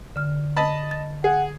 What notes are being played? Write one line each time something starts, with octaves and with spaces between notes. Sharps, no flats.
D3 F6
D#5 A5 B5
A6
G#4 F#5